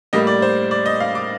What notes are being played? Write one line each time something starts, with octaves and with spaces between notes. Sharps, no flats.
A2 G3 A#3 D#5
D5
C5
D5
D#5
F5
D6